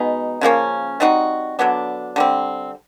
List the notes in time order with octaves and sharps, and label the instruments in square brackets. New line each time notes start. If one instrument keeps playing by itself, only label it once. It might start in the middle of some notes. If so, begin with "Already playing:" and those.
Already playing: [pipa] B2 G#3 B3 D#4
C#3 F3 A#3 C#4
G3 C4 D#4 F#4
D3 F#3 B3 D4
D3 G3 C4